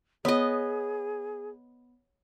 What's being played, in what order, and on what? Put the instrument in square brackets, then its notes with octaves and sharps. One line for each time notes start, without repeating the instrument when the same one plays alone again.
[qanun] B3 D#5 [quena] G#4 [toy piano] C#5